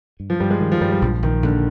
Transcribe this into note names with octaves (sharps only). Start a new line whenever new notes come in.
G2
F3
G2 G3
G#3
D#3
F3
G2 G3
G3
A#1 F3
A#1 D#3
A#1 D3